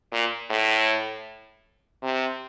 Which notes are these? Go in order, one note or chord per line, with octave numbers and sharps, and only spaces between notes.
A#2
A2
C3